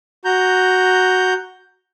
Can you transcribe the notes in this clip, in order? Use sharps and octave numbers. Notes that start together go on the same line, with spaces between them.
F#4 A#5 G6